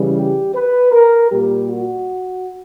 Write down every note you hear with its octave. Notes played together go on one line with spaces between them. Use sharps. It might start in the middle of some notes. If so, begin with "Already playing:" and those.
Already playing: C#3 E3 G3
G4
B4
A#4
A#2 G3 G4
F#4